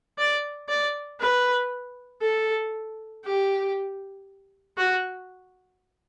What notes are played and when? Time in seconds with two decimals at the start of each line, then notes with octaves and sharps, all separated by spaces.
0.18 D5
0.69 D5
1.20 B4
2.22 A4
3.25 G4
4.78 F#4